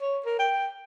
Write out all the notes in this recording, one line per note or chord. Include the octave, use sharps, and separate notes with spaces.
C#5
A#4
G5